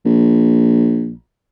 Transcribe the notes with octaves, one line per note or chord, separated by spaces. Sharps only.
A#1